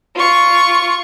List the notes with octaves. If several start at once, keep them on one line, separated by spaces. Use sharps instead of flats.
F4 C#6